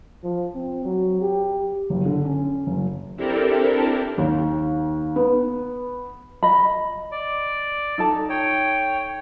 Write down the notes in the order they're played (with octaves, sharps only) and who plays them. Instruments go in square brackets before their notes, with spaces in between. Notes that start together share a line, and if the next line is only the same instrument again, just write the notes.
[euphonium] F3
C4
F#3
G4
[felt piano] F#1
D3
C#4
F#1
[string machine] C4 D4 E4 G4 A4 A#4
[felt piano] D#2
B3
[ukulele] D#5 B5
[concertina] D5
[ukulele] D#4 A4 A5
[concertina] C#5 G5